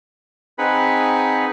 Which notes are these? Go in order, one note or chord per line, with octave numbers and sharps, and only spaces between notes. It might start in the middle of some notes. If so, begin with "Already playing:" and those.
C4 D#4 G#4 B4 F#5 B5